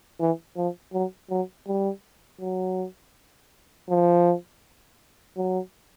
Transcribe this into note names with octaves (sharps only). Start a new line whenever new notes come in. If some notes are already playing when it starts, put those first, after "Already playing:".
E3
F3
F#3
F#3
G3
F#3
F3
F#3